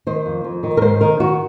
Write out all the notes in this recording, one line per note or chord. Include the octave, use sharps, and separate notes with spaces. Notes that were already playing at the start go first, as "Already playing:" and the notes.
D#3 C5
F2
F2
D#3
A#4
G#2 C5
D#3 A#4
D#3 F#4